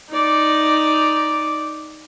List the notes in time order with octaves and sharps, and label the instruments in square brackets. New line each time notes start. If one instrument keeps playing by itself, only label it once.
[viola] D#4 D5